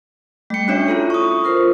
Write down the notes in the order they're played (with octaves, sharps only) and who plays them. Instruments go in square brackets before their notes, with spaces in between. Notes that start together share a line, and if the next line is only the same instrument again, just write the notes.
[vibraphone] G3 G5 [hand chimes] A3 C#7
[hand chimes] C#4 D4 C#5 [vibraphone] F#4 E5
[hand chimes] E4 F4 A4
C#6 D#6
[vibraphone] F4 A#4 C5